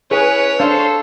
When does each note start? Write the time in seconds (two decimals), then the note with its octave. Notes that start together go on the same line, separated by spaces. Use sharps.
0.11 C#4 E4 G#4 B4 C#5 G#5
0.60 D4 A4 C5 F5